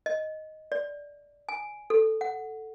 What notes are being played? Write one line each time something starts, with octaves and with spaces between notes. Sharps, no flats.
D#5
D5
G#5
A4
F#5